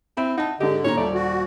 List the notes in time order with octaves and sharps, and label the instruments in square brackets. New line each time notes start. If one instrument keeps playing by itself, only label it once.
[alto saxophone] C4 [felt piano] E4 E5 B5
[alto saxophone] D#4 [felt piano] F#5 A5
[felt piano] G#2 D#5 [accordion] D3 [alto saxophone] G4
[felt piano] A#2 D#3 A#5 [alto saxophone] C#5
[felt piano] D#1 [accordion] A3 [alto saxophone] D5
[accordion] F#4